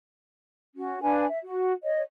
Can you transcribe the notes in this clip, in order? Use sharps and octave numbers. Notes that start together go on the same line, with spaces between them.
C#4 F#4
D4 B4 F5 G#5
E5
F#4
C#5 D#5